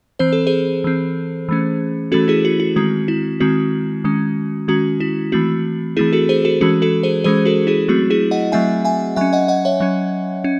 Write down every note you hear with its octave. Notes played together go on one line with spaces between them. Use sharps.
E3 C4 C5
A4
G#4 C5
E3 C4
E3 A3 C#4
E3 A3 C#4 F#4 A4
E4 G#4
F#4
F#4
D#3 G#3 C4 F#4
E4
D#3 G#3 C4 F#4
D#3 G#3 C#4
D#3 G#3 C#4 F#4
E4
E3 A3 C4 F#4
E3 A3 C4 E4 G#4
F#4 A4
G#4 C5
F#4 A4
E3 G#3 C#4 F#4
F#4 A4
G#4 C5
E3 G#3 C#4 G#4 C5
F#4 A4
E4 G#4
F#3 A3 C4 F#4
E4 G#4
D#5 F#5
F#3 A3 C4 E5 G#5
E5 G#5
F#3 C#4 E5 G#5
D#5 F#5
D#5 F#5
C#5 E5
F#3 C#4
C#4